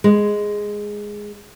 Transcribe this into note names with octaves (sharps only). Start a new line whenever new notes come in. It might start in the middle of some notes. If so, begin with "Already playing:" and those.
G#3